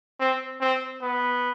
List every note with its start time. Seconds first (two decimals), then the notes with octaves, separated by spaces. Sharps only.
0.20 C4
0.61 C4
1.01 B3